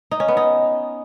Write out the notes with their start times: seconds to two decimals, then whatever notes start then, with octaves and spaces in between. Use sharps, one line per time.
0.11 D#4
0.20 C#4
0.28 B3
0.37 D#4